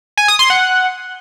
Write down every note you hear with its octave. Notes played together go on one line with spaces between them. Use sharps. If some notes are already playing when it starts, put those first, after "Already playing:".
G#5
D#6
C6
F#5